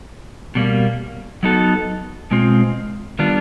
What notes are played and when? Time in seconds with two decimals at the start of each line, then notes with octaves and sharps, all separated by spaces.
0.55 B2 G3 A#3
1.43 F#3 B3 D#4 F#4 A4
2.31 B2 G#3 C4 F4
3.19 D#3 G3 B3 D4 F4